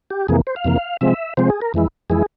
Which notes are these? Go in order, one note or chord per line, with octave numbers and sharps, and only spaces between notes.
G4
F2 C3 E3 A#3 G#4
C5
F5
F2 C3 E3 A#3
C3 F3 G#3 C4 E5
C3 F3 G#3 C4 C5
G#4
A#4
F2 E3 G#3 E4
F2 E3 G#3 E4 G#4